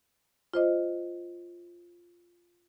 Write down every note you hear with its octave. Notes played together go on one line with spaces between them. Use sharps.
F4 C5 D#5